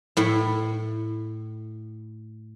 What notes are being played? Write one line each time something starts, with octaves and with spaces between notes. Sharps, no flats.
A2 E4